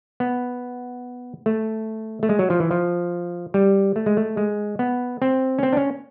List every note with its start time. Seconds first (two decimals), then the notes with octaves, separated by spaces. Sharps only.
0.20 B3
1.46 A3
2.23 A3
2.29 G#3
2.39 F#3
2.50 F3
2.60 E3
2.71 F3
3.54 G3
3.96 A3
4.06 G#3
4.17 A3
4.37 G#3
4.79 B3
5.22 C4
5.59 C#4
5.63 C4
5.73 D4
5.77 C#4